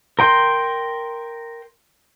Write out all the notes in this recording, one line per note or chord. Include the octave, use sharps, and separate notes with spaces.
A#4 G5 C6